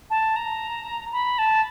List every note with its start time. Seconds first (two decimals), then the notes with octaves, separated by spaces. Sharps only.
0.10 A5
0.36 A#5
1.13 B5
1.39 A5